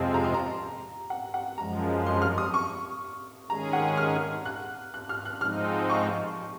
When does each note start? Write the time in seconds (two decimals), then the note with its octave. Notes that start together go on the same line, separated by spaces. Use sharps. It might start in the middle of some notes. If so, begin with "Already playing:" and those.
Already playing: F2 C3 F3 G#3 C4
0.14 A#5
0.24 C6
0.34 A#5
1.10 F#5
1.34 F#5
1.58 F#2 F3 G#3 A#5
2.06 C6
2.22 F6
2.38 D#6
2.54 C#6
3.49 D#3 G#3 C#4 G#4 A#5
3.73 F#5
3.97 F6
4.45 F#6
4.94 F#6
5.09 F6
5.25 F#6
5.41 G#2 F3 G#3 C4 D#4 F6
5.90 C#6